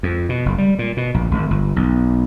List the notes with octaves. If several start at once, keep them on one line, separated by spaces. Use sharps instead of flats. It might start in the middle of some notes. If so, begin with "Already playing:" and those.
F2
B2
F#1
G3
A#2
B2
A#1
G#1
G1
B1